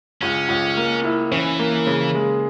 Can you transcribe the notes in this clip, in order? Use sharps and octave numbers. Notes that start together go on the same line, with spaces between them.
C#2 C#4
C#2
A#3
E4
E3 C#4
A#3
C#3
G#3